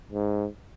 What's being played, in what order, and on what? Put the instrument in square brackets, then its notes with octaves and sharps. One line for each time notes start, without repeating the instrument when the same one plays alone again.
[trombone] G#2